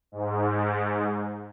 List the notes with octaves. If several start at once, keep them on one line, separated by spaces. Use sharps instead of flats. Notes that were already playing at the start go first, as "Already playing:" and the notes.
G#2